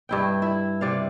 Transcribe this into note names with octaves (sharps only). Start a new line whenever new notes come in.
G2 E4 G5
E4
C3 D5 F5